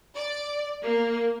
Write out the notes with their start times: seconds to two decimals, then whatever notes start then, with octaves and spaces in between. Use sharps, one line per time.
0.16 D5
0.83 A#3